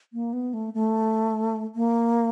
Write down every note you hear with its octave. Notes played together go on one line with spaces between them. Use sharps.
A#3
B3
A3
A3
A#3